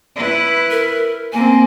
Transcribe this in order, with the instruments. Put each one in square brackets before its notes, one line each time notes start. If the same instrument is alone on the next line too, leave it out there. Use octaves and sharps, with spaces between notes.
[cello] E4 B4
[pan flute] A#4
[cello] A#3 C4 [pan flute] G#5